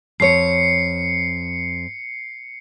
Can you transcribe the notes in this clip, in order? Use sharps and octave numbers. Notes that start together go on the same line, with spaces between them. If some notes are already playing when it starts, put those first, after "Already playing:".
F2 C#5 C7 C#7